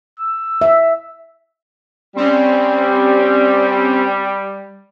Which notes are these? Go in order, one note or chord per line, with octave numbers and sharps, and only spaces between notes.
E6
E5
G3 C4 C#4